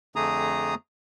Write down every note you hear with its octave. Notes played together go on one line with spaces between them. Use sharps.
F2 D3 A3 G#4 A#5 D#6